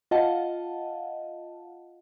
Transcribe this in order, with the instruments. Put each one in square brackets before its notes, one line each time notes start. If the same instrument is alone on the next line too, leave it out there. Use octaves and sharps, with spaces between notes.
[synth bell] F4 D#5 F5 F#5 A5